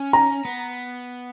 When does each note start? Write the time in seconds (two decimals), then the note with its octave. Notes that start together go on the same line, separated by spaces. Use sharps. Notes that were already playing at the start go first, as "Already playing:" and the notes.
Already playing: C#4
0.13 A#5
0.45 B3